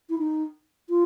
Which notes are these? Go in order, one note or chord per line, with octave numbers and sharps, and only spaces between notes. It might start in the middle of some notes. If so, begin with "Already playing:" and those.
E4
D#4
F4